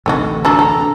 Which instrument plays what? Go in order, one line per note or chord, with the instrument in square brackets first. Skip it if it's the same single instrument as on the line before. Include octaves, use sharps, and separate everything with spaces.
[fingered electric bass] A1 D2 C3 [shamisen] A3 D#4 F#4
[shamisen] D4 F#4 A4 [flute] A#5
[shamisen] A4